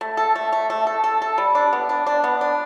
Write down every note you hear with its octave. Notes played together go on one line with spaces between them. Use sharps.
A3
A4
A3
A3
A3
A4
A4
A4
G3
D4
B3
D4
D4
B3
D4